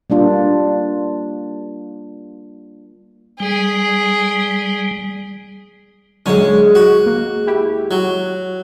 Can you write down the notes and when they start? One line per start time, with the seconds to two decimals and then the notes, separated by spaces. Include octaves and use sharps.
0.10 G3 A#3 D4 F4
3.40 G3 G#4
6.26 D#2 D3 F#3 G#3 C#4
6.75 F#4
7.06 A#3
7.47 E4 G4
7.91 F#3